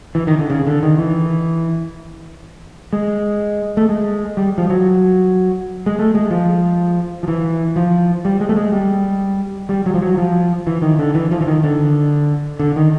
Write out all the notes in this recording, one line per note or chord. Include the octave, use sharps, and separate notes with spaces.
E3
D#3
D3
C#3
D3
D#3
E3
G#3
A3
G#3
G3
F3
F#3
G#3
A3
G#3
F3
F3
E3
F3
G3
G#3
A3
G#3
G3
G3
F#3
F3
F#3
F3
E3
D#3
D3
E3
F3
E3
D#3
D3
D3
D#3